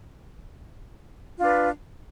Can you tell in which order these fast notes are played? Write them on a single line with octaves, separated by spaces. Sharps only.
F4 D4 B4